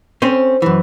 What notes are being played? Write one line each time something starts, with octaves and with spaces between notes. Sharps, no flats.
C4 C#4 C5
F#2 E3